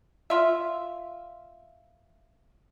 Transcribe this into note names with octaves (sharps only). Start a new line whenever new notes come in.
F4 E5